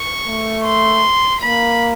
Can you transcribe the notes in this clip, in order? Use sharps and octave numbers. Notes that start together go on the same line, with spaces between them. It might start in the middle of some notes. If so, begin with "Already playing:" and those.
Already playing: C#6
A3
C6
A#3 B5